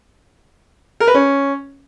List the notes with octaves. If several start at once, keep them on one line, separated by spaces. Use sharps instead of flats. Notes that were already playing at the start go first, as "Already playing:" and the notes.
A#4
B4
C#4